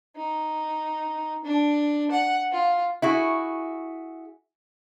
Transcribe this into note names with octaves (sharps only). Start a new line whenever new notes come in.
D#4
D4
F#5
F4
E4 F#4 G#4